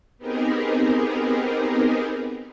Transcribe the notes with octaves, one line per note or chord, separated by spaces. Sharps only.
B3 C4 D#4 G4 G#4 A#4